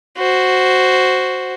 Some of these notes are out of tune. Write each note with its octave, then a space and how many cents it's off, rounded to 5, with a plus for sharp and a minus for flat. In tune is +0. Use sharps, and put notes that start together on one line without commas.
F#4 +0 C5 +0